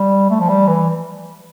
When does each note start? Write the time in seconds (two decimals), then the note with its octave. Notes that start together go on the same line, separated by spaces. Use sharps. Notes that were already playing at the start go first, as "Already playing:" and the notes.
Already playing: G3
0.30 A3
0.40 F3
0.49 G3
0.67 E3